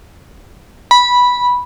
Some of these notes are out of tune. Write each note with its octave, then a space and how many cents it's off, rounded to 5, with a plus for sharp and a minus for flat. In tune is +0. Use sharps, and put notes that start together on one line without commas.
B5 -10